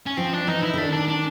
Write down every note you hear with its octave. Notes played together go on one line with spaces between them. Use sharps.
C#4
F3 C4
D4
E3 D#4
E4
D3
D#3 D4
D4
D4